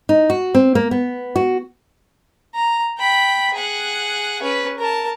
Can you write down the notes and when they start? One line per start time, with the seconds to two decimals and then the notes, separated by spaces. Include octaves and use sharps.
0.09 D#4
0.30 F#4
0.55 C4
0.75 A#3
0.91 B3
1.36 F#4
2.55 A#5
2.98 G5 B5
3.54 G#4 F#5
4.42 C#4 B4
4.79 A#4 A5